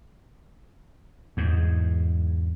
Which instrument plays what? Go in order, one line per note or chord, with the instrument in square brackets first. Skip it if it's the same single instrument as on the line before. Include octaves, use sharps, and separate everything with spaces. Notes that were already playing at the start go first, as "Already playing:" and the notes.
[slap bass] E2 G#2